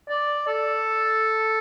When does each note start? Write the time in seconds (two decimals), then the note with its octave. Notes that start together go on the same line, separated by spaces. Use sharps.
0.09 D5
0.48 A4